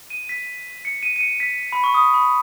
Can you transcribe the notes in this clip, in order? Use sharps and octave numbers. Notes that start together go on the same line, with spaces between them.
D#7
B6
C#7
D#7
D#7
C#7
B6
B5
C#6
D#6
B5